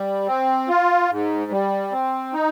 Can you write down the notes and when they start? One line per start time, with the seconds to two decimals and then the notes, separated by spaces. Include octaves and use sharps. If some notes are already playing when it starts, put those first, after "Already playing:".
Already playing: G3
0.27 C4
0.68 F4
1.10 G#2
1.51 G3
1.92 C4
2.33 D#4